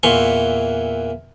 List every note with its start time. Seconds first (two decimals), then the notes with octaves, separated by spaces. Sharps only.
0.03 E2 A#2 E3 C6 C#6